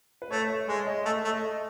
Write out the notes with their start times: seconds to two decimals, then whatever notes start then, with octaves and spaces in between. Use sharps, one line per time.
0.22 B4
0.30 A3 C#5
0.49 E5
0.68 G#3 C#5
0.86 D#5
1.05 A3 E5
1.24 A3
1.32 D#5